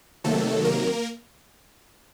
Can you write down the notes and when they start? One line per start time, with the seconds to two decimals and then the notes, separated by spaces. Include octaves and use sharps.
0.24 C3 D#3 F#3 A3 A#3 A4
0.65 A#3 A#4